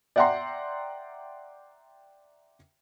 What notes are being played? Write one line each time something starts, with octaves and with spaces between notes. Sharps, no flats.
D5 E5 F#5 G5 A#5 C6